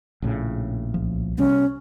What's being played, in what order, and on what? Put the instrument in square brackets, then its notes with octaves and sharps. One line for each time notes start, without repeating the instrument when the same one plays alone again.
[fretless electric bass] A#1 A2 C#3
[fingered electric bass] C2 F3
[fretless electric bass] C3 G3 B3 [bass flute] C#4